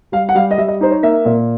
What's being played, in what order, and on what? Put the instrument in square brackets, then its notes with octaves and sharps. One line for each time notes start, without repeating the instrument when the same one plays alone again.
[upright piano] G3 F5
F#5
G3 F5
D#5
G3 E5
D#5
D#4 C5
C#5
A#3 E5
A#2